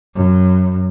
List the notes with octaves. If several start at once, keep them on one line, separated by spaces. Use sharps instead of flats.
F#2